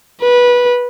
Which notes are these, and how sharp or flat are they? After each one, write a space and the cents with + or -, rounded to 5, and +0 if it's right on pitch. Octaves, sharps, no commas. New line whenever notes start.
B4 -15